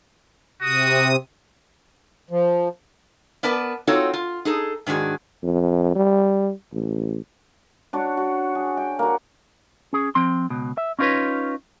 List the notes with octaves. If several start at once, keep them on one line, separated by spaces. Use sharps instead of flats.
C3 F#4 D#6
F3
B3 A#4 B4 D5 A5
C4 D#4 F4 F#4 A4 C#5
F4
D#4 G#4 A4
G#2 D#3 D4 F#4 G#4
F2
G3
A1
D4 F#4 C#5
F#4
G#4
G5
A#3 F#4
C#4 G#4
F3 C4 C6
C#2 B2
E5
C#4 D#4 F4 A#4 B4 C#5